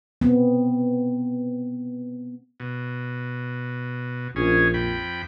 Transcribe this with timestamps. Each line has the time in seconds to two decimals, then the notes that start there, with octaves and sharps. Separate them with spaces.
0.21 B3 C4
2.60 B2
4.36 A#1 C#4 G#4
4.74 F2 G5 B5